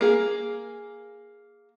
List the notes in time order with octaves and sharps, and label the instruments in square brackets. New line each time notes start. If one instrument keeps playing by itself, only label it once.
[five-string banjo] A#3 G#4